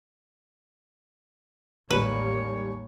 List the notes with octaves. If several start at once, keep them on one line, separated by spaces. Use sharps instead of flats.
A1 D#2 G3 G#3 A#3 B4 C#5